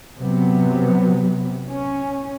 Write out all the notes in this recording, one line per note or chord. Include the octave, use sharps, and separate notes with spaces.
C3 F#3 B3
C#4